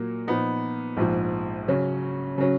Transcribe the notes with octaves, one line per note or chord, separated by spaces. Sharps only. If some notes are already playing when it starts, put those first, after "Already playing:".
Already playing: A#2 F#3 A#3
A#2 F3 B3 D#4
A#1 G#2 F3
C#3 F#3 C#4
C#3 F#3 C#4